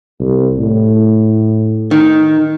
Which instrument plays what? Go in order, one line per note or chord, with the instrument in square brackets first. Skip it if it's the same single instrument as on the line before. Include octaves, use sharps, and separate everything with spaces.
[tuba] C2
A2
[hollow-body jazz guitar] D#3